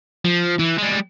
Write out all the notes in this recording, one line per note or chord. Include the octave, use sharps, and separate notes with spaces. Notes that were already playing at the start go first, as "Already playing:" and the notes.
F3
E3
G3 G#3